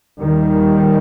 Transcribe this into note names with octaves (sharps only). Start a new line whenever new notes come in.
D#2 D#3 G3